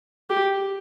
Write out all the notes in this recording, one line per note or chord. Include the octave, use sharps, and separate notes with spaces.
G4